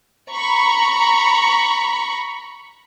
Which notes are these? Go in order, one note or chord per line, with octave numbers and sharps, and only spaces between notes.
A#5 B5 C#6